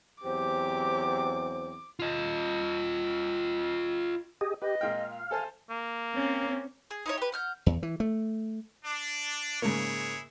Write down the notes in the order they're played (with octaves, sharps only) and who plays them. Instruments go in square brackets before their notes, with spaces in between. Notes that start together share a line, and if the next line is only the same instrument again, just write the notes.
[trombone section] E2 F#3 C4 [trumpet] G4 [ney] C5 [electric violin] D6
[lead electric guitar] F4 D#5
[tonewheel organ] G4 G#4 D#5
[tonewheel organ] G4 [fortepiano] B4 [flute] D#5
[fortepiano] A#2 G#3 G5 [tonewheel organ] F5
[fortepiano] A4 C5 A5 [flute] G#5
[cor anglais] A#3
[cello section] C4 C#4
[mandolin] G#4
D#4 E4 C#5
G4 B4
F#5 F6 G6
[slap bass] E2
E3
A3
[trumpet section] D4
[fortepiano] G#2 C#3 A#3 [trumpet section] E4 G#4 C#5